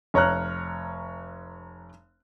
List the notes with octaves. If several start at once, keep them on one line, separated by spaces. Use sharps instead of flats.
F1 C#5 A#5 F6 F#6